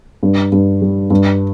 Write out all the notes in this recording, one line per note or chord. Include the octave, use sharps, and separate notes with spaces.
G2
G2
G3
G2